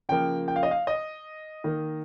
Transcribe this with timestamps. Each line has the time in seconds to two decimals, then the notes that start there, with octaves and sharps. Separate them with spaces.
0.09 C#3 F3 A#3 G5
0.48 G5
0.56 F5
0.63 D#5
0.71 F5
0.87 D#5
1.64 D#3 A#3